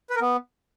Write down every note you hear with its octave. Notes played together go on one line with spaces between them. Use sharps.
B4
A#4
B3